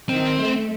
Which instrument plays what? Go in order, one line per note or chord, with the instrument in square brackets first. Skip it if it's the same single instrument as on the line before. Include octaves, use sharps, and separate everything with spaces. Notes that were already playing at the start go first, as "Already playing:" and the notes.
[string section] D#3 [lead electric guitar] C4
[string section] A3